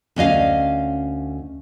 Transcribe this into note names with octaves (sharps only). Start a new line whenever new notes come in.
D2 C#4 D#5 F5